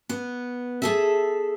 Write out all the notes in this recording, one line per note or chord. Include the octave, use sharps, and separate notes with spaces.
B3
G#4 A4 E5